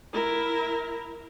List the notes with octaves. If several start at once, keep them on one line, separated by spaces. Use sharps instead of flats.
E4 A#4